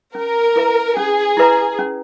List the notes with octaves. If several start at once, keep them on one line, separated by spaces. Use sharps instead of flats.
C#4 A#4
E4 B4 E5 A#5
C#4 G#4
E4 B4 E5 A#5
C#4